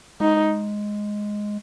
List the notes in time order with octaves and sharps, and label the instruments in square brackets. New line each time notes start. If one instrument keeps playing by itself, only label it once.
[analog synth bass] G#3 [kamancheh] D#4